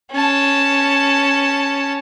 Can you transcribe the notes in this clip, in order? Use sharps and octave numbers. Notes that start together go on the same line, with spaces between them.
C#4 A5